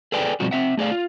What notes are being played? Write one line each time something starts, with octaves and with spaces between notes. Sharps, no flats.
G#4 A4 B4 D5 G5 G#5
B2 F3 G3 C4 F#4
C4 E5 F#5
A3 G#4 D5 F5
F4